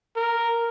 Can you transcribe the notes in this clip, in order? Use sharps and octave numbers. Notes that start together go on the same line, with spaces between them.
A#4